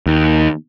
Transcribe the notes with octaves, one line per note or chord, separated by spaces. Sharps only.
D#2